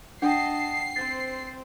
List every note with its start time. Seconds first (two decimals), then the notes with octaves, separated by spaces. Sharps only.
0.22 D4 D#5 F#5 G5 A5 C7
0.96 C4 C5 A6